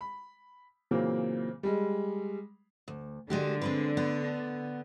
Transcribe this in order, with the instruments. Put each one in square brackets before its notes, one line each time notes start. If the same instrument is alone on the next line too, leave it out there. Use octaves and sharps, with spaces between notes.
[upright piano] B5
A#2 C#3 E3 F#3 A#3 C4
G3 G#3
[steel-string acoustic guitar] D2
[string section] D3 [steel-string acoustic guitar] G#3 F#4 G4
[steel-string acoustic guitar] G#3 C4 B4
B3